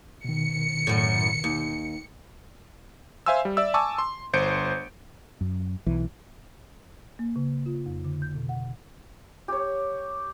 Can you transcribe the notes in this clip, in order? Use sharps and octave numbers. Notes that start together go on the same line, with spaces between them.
B2 D#3 C#7
F#2 A2
D#2
C5 E5 F5 G#5 C6 E6
G3
D5 E5 E6
G#5 A5 C#6 D6 E6
C6
G1 C5 G6 C#7 D7
F#2
B1 E3
A#3
C#3
F4
F2
D3
G6
B2
F#5
G4 C#5